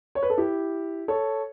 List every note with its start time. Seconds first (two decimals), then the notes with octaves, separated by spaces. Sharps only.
0.15 C#5
0.23 B4
0.30 A4
0.38 E4 G4
1.08 A4 C#5